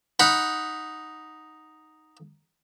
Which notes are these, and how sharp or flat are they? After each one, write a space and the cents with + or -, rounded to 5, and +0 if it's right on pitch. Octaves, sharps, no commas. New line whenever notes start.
D#4 +0 F#5 -10 B5 +0